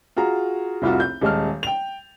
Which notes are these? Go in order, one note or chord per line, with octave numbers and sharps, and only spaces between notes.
F4 F#4 G#4 A#5
F1 C2 F4 F#4
G6
D#1 G#3 A5 F6
G5 F7